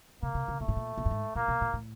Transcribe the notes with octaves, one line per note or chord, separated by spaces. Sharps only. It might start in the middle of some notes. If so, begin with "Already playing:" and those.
C3 A#3
C3
C#3
A#2 A3
A2
A#2
A#2
G2
G#2
A#2 A#3
B2
A#2
A2